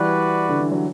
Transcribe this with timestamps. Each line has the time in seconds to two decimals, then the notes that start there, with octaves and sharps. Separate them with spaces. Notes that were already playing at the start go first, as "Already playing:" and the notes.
Already playing: E3 G3 F#4 B4 D5
0.49 D3
0.60 E3
0.72 F#3